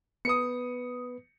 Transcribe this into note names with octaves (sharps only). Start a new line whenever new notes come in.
B3 B4 D#6 C#7